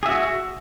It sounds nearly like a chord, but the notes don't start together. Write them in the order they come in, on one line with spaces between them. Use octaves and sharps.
G#4 E5 F#4